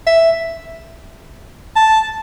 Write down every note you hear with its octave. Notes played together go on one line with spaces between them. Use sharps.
E5
A5